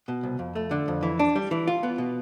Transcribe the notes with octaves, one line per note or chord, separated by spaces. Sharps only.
B2
C2
F2
A3
D3
F2
E3
D4
G3
E3
F4
B3
B2